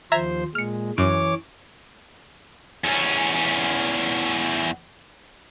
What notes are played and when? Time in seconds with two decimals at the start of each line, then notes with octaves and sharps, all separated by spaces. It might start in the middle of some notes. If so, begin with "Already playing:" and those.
0.12 D#2 F3 C5 E5 A#5 G#6
0.55 A#2 G#3 F6 C#7
0.98 F#2 E3 C#5 D6
2.84 E2 C#4